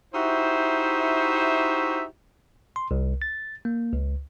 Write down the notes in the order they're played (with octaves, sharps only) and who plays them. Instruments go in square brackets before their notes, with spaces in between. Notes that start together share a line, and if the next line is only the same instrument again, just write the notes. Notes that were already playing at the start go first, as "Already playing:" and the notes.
[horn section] D#4 E4 F#4 G4 C5 E5
[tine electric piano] C6
C2
A6
A#3
C#2